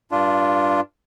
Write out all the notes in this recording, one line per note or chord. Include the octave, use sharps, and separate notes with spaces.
G2 D4 F4